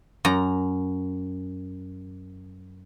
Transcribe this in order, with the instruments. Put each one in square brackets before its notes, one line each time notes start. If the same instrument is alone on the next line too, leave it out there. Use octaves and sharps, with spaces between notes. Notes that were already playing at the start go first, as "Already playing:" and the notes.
[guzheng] F#2 A#5